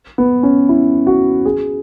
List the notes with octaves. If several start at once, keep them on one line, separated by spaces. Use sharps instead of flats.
B3
C#4
E4
F#4
G#4